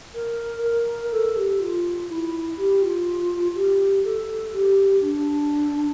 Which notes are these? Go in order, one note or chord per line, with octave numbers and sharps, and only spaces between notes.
A#4
A#4
A4
G4
F4
E4
G4
F4
G4
A4
G4
D4